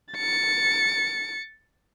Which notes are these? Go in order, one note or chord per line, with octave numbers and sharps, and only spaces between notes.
A6 C#7